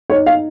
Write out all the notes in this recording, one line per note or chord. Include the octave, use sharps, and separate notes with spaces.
D#4 C#5
F5